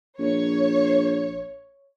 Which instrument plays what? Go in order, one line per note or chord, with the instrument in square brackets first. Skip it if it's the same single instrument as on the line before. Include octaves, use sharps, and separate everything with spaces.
[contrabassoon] A#1 [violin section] C#5